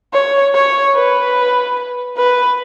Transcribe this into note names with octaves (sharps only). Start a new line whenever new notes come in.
C#5
C#5
B4
B4